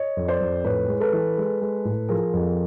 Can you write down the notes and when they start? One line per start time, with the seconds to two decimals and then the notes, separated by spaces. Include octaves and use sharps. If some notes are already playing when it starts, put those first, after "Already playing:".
Already playing: C#5 D#5
0.17 F2
0.28 C5 D5
0.40 F2
0.64 A2 B4 C#5
0.88 G#3
1.00 A4 B4
1.13 E3
1.37 G#3
1.61 G#3
1.85 A2
2.09 F3 G#4 A#4
2.33 F2